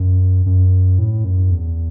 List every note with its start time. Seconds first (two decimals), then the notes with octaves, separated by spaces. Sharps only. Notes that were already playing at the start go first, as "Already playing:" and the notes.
Already playing: F#2
0.46 F#2
0.99 A2
1.24 F#2
1.51 E2